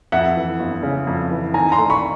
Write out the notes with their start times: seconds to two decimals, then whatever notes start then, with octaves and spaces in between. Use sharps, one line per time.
0.12 F2 E5 F#5
0.36 E3
0.60 G1
0.83 C#3
1.07 F2
1.31 E3
1.54 D#3 G#5 A#5
1.72 A#5 C6
1.78 A3
1.90 B5 C#6